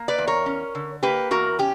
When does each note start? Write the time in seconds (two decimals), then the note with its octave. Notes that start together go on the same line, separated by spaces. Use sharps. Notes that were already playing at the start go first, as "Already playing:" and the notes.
Already playing: A#3
0.08 B4 D5
0.18 E2
0.27 A#4 C#5
0.46 C#4
0.75 D3
1.03 A#3 G4 B4
1.31 E2 F#4 A#4
1.59 C#4 G4